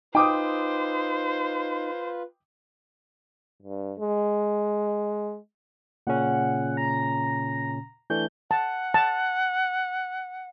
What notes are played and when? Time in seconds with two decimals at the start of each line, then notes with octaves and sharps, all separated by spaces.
0.15 D#4 F4 B4 C5 G5 D6 D#6
3.63 G2
3.99 G#3
6.07 A#2 C#3 C#4 F#5
6.77 A#5
8.10 E3 A3 D4 G6
8.51 F#5 A5
8.94 A5